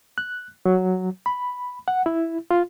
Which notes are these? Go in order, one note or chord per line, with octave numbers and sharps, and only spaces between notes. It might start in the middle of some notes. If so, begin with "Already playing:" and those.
F#6
F#3
B5
F#5
E4
F4